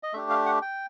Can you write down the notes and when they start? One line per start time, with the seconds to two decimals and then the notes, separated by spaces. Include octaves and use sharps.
0.03 D#5
0.13 A3 D4 G4 E5
0.30 F5
0.46 F#5
0.62 G5